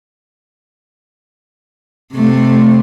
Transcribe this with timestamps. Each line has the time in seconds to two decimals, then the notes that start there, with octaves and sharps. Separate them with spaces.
2.14 C3 A3